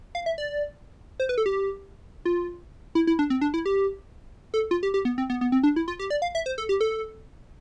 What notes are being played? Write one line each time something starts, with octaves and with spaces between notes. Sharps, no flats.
F5
E5
D5
C5
B4
A4
G4
F4
E4
E4
D4
C4
D4
E4
G4
A4
F4
G4
G4
B3
C4
B3
B3
C4
D4
E4
F4
G4
D5
F5
E5
C5
A4
G4
A4